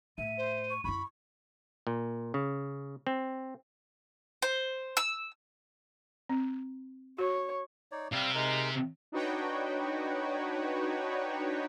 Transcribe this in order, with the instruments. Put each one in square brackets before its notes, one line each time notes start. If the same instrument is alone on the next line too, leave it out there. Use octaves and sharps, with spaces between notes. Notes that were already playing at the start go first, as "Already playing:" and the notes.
[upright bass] A2 [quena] E5 [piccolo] D#7
[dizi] C5
[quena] C#6
[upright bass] F#2 E4 [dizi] B5 [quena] C#6
[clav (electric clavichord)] A#2
C#3
C4
[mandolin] C5
E6
[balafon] C4
[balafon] F#4 [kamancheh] C#5
[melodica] D#4 C#5 D5
[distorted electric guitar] C3 [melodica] G3 F5
[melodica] G#3 D#4 A#4
[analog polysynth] D4 D#4 F#4 B4 C#5 G5